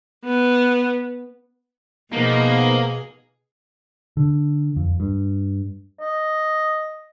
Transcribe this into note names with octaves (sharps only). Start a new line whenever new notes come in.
B3
B2 F3 A#3 B3 D#4 G#4 D#5
D3
F2
G2
D#5